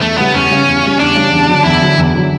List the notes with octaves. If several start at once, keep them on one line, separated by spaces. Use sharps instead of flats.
E2 A3
C#3 G3 B3
E2 C#4
C#3 G3
E2
C#3 G3
E2 D4
C#3 G3
E2
D3 F#3
E2 E4
D3 F#3
E2
D3 F#3